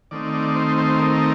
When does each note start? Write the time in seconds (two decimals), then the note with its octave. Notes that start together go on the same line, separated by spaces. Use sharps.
0.11 D#3 A3 C4 D#4 D5
0.34 D5
0.56 C5
0.78 C5
1.00 A#4